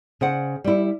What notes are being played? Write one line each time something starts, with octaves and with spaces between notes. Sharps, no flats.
C#3 C5 F#5
G3 E4